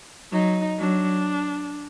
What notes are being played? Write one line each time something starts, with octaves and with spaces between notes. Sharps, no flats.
F#3 D#4
F#3 D4